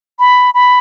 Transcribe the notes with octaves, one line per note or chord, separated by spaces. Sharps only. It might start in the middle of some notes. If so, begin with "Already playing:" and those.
B5
B5